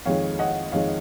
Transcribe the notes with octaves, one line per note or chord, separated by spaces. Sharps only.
F2 D#3 G#3 C#5 F5
D#5 F#5
F2 D#3 G#3 C#5 F5